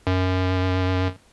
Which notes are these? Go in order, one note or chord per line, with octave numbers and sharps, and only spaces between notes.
F#2